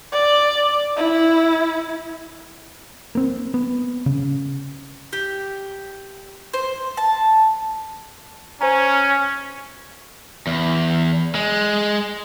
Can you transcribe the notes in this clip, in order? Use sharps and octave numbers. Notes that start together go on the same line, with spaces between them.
D5
E4
A#3 C4
B3
C#3
G4
C5
A5
C#4 C5 G#5 A#5
E2
G#3